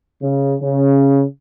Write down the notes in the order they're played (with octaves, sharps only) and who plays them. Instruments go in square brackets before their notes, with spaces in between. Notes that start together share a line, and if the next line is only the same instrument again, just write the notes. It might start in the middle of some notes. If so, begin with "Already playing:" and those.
[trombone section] C#3
C#3